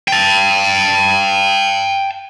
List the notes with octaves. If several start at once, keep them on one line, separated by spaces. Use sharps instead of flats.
G5 A5